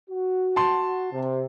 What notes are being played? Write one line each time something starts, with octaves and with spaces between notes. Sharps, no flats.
F#4
A5 C6
C3